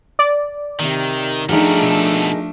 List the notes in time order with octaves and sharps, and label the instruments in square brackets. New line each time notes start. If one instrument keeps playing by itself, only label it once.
[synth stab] D5
[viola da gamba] C3 [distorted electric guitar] D#3
[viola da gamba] F3 A3 D4 [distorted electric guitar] G3 F#4 [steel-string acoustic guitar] D#4 G#4 A#4
[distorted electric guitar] B2 A4